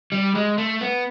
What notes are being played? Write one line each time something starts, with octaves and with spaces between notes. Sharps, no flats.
G3
G#3
A3
B3